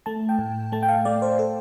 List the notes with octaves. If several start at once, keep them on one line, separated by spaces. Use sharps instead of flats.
A3 A5
G5
A2
A3 A5
G5
F5
A3 D5
C5
A4